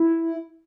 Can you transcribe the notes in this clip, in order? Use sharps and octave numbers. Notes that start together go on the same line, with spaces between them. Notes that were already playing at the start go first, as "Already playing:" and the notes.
Already playing: E4